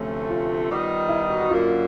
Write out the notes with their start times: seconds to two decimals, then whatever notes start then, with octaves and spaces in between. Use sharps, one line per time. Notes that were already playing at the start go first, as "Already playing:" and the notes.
Already playing: D2 C3 F3 A3 C#4
0.29 F4
0.69 D#3 G3 B3 D#4
1.09 E4
1.30 F#4
1.40 F#4
1.49 F#2 D3 F#3 A#3 F4